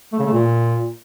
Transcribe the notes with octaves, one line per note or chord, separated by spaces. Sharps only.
A3
C#3
A3
A#2